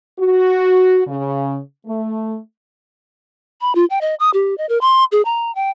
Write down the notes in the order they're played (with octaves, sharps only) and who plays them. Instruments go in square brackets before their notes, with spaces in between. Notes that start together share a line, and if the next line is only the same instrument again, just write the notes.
[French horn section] F#4
C#3
A3
[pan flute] B5
F4
G5
D#5
D#6
G4
D#5
A#4
C6
G#4
A#5
G5